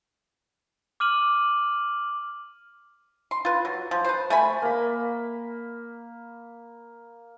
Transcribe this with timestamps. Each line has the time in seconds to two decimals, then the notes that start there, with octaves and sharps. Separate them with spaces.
1.00 D6 F6 D#7 F#7
3.31 C6
3.45 F4 B4
3.65 F#3
3.91 F3
4.04 B4 C5
4.30 A3 G#5 B5
4.62 A#3 B5